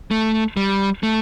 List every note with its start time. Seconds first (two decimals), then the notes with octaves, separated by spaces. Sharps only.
0.11 A3
0.57 G3
1.03 A3